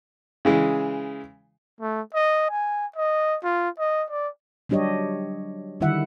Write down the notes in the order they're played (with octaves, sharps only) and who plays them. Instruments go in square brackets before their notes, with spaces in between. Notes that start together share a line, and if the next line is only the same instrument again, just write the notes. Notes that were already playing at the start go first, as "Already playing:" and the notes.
[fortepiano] C#3 E3 G#3
[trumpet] A3
D#5
G#5
D#5
F4
D#5
D5
[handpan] F#3 G3 D4 G4 C#5 D#5
D3 D#3 G3 E4 E5 F#5